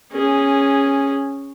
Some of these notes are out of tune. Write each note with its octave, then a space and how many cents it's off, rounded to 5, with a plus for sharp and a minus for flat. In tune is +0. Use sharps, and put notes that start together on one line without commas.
C#4 -5 G#4 -10